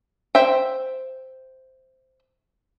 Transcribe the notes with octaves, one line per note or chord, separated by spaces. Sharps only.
C5 E5 G5